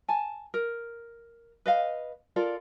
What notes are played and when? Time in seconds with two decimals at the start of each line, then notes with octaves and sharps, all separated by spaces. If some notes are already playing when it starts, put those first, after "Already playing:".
0.08 G#5 A5
0.54 A#4
1.66 B4 D#5 F5
2.36 F4 A4 A#4 D5